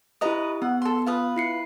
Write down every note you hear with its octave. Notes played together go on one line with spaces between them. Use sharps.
E4 G4 B4 D#5 A#5 D#6
B3 F#5
A4 C6
F4 B4 D#6
E4 C7 C#7